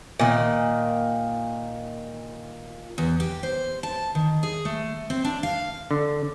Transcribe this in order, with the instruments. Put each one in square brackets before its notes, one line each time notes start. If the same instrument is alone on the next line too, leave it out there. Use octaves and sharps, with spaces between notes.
[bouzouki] A#2 D#3
[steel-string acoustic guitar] E2
G4
C5
A5
D#3
G#4
A3
C4
D4
F5
[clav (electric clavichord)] D3